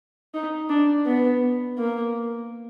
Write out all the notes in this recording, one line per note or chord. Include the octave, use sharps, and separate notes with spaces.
D#4
D4
B3
A#3